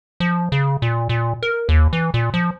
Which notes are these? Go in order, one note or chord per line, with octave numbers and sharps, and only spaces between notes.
F3
C#3
A#2
A#2
A#4
D#2
E3
A#2
F3